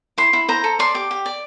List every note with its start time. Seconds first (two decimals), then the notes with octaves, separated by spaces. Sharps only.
0.18 E4 C6
0.33 E4
0.48 C5 A#5
0.64 A4
0.79 D5 C6
0.94 G4 D6
1.11 G4
1.26 D5